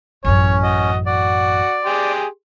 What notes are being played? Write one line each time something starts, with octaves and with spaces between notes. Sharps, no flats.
A1 F#2 C#4 C#5
F#4 D#5
F#4 D5
G4 G#4 C6